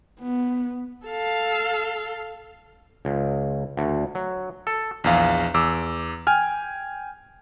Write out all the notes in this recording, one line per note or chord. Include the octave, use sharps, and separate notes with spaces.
B3
A4 F5
C#2
D2
F#3
A4
A#1 E2 F5
E2 D6 E6
G5 G#5 F6